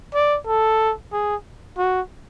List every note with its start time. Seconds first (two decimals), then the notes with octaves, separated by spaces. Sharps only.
0.15 D5
0.47 A4
1.13 G#4
1.78 F#4